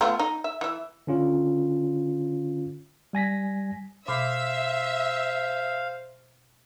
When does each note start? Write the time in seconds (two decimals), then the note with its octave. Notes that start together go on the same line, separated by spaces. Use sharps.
0.01 A3 B3 F4
0.19 D#4
0.44 E5
0.61 E3 E5
1.07 D3 C#4 F4
3.13 G3 G#5 A#6 B6
4.08 B2 C5 E5 F5 D6